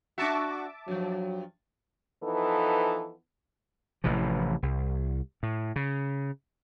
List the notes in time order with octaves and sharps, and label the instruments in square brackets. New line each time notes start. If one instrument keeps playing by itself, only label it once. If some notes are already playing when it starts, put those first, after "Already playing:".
[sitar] D4 F#4 [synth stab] E5 A5 D6
[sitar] G2 F3 [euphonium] F#3
[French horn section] E3 F3 B3 D#4 A4
[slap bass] A1 C3 E3 F3
C2
A2
C#3